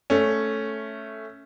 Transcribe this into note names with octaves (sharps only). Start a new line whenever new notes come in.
A3 C#4